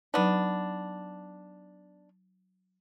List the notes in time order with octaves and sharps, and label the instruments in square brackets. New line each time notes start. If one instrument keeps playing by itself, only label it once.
[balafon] F#3 D#4 [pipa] B3 D4